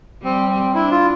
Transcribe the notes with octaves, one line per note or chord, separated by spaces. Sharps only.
G3 C4
C4
D4 E4
F4